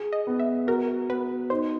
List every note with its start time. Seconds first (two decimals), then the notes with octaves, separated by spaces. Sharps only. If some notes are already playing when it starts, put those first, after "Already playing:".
Already playing: G#4
0.12 D#5
0.27 B3
0.39 E5
0.67 F#4 A#4
1.09 B3 B4
1.50 D#4 C5